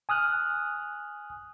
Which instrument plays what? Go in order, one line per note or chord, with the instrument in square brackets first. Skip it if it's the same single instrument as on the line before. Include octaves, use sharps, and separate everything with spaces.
[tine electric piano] G#5 D#6 F6 F#6